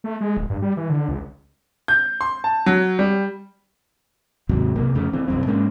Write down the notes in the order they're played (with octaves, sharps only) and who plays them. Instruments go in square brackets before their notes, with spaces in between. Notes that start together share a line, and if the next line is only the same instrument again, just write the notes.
[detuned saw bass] A3
G#3
D1
G2
G3
E3
D3
C#2
[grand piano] G6
C6
A5
F#3
G3
[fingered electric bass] D#2 G#2 C3 F#3
B1 C3 A#3
F2 C#3 A3
E3 C4
C2 F#2 C4
G#2 G#3 A#3 C#4